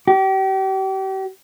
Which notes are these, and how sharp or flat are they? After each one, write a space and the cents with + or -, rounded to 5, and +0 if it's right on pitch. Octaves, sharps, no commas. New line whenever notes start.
G4 -35